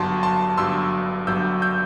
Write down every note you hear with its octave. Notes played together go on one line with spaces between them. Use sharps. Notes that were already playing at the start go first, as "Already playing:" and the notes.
Already playing: G1 G2 F#3 A5 C6
A5 C6
G1 G2 F#3 C6 E6
G1 G2 F#3 E6 G6
E6 G6